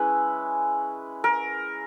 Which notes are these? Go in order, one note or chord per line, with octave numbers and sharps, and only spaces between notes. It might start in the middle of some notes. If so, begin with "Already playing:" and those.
Already playing: G#3 C#4 E4 B4
A#4